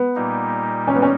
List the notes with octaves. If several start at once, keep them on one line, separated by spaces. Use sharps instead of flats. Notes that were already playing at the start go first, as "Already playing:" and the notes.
Already playing: B3
A#2 G3 A#3 D#4
C#4
B3
C#4